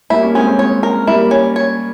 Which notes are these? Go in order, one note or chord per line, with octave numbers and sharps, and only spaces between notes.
G3 A#3 E4
A#3 C#4
G#3 C4 C#4
G#3 C4
C#5
A#4
G3 A#3 E4
C#4
C#5